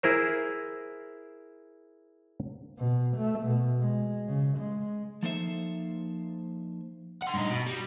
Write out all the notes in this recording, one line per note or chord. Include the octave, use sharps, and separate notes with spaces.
E4 G#4 A#4 C5
B2
A3
B2
G#3
C#3
G#3
F3 A#3 D#4 A4 C5 E5
F#5 C6
G2 D#4
B2
G3